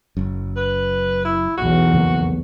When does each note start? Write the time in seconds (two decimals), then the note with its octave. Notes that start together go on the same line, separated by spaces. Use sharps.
0.17 F#1 F#2
0.57 B4
1.25 E4
1.57 B1 E2 F#4
1.93 F2 C#3 A#3